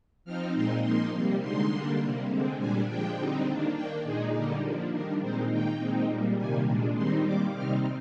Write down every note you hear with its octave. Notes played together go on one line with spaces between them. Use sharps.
F3 C4 D#4 F6
A#2 G#3 C4 D#4 C6
F3 A#3 D#4 C6
C3 G3 A#3
D3 G#3 D#4 C6
D3 G3 A#3 D4
C3 G3 A#3
D3 G#3 C4
A#2 G3 D4 G#5
F3 G#3 D4 G5
D3 G3 C4 D#4
D#3 A#3 D4
D#3 A#3 D4 G5
A#2 G#3 D#4 G#4
D3 G3 A#3 D#4 G4
F3 A#3 D4
D#3 G3 D4 A#4
A#2 G#3 C4 D#4 C5
D#3 A#3 D#4 G5
A#2 G#3 C4 D#4
A#2 G3 A#3
C3 D#3 G3 A#3 G#5
A#2 G#3 D4
D#3 G3 C4 D#4 C6
D#3 G3 A#3 D6
C3 G3 C4 D#4 F6